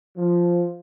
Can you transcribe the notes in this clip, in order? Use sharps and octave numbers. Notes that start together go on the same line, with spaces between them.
F3